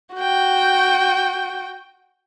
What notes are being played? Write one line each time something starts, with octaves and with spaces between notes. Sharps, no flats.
F#4 G5